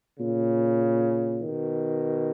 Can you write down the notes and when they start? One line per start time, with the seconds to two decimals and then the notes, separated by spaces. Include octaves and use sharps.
0.20 A#2 C#3
1.42 B2 D#3